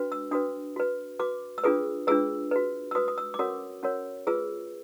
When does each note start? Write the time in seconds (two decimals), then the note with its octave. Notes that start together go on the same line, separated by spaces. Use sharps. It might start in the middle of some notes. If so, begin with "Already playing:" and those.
Already playing: D4 F#4 B4
0.12 E6
0.31 D4 F#4 B4 D#6
0.76 F#4 B4
1.19 F#4 B4 D6
1.58 E6
1.64 D4 F4 G#4 B4 D#6
2.07 D4 F4 G#4 B4 E6
2.51 F#4 B4
2.91 E6
2.95 F#4 B4 D#6
3.08 D#6
3.18 E6
3.34 D6
3.39 C#4 F#4 A#4 C#5 D#6
3.83 C#4 F#4 A#4 C#5
4.27 F4 G#4 B4 E6